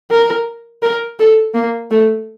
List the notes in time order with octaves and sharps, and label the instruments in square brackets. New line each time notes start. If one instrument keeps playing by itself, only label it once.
[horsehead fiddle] A#4
A#4
A4
A#3
A3